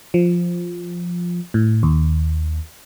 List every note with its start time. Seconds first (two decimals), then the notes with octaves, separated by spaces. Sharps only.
0.14 F3
1.54 A2
1.83 D#2